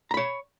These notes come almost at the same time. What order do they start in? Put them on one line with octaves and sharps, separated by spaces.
A#5 B5 C#5